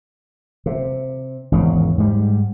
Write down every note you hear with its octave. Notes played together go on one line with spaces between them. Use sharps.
C3
G#1 E2 C#3
G#2 G3